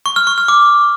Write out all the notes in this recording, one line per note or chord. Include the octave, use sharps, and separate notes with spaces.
C#6
F6
C#6
F6
D6